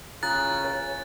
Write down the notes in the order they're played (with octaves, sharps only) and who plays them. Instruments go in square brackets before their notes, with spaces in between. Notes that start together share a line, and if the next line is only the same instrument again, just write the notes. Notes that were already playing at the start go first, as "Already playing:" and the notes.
[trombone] C#3 [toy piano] F4 A#5 D#6 [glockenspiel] F#6 [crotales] A6
[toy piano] C#5